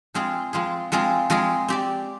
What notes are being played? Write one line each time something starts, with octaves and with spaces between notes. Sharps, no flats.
F3 G#3 C4 F4 G#4
F3 G#3 C4 F4 G#4
F3 G#3 C4 F4 G#4
F3 G#3 C4 F4 G#4
C4 G4 D5